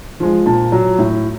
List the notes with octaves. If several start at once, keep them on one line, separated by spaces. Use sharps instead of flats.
F3 G#3
A#2 A5
F#3
A2